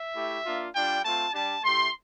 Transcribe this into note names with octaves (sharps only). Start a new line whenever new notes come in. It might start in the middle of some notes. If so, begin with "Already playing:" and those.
Already playing: E5
A3 E4 G4
A#3 D4 F4
G3 D4 F4 G5
A3 C4 F4 A5
G3 D4 G4 A5
A3 E4 G4 C6